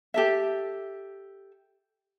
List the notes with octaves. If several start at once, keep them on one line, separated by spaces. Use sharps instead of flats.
G4 A4 E5